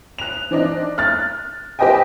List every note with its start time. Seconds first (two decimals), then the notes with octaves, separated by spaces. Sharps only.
0.19 F#6 F7
0.51 E3 C4 D4 D#4
0.98 F6 F#6 A6
1.79 G4 B4 C5 D#5 G5 G#5